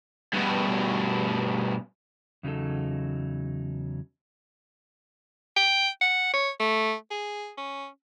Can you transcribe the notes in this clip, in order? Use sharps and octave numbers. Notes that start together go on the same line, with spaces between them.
G2 B2
E2 C#3 F#3 D#4 A4
G5
F#5
C#5
A3
G#4
C#4